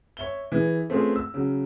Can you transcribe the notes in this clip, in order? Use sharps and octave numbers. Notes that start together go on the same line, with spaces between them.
C#5 E5 G7
E3 G#4
A3 C4 C#4 F4 G#4 B4
E6
C#3 F#3